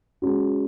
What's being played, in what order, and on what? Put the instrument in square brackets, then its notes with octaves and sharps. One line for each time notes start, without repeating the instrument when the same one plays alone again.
[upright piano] G#3 C#4 F#4